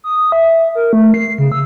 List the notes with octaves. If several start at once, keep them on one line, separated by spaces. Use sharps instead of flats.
D#6
E5
A#4
A3
C7
C#3
E6